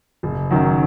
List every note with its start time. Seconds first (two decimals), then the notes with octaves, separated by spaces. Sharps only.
0.23 F#1
0.51 F#2 D#3 F#3